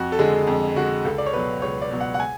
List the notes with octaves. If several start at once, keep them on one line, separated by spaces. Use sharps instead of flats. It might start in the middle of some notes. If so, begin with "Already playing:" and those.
Already playing: F2 F#4
A4
D3 G#3 G#4
F2
D3 G#3 F#4
C#2 A4
D5
C#5
B2 F#3 B4
C#2 C#5
D5
B2 F#3
F#5
F#5
G#5